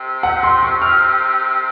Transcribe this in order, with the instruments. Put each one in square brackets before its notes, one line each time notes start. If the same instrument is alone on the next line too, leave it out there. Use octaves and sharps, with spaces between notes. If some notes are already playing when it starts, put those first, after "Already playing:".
Already playing: [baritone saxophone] C3
[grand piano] F#5
C6
C#6
F6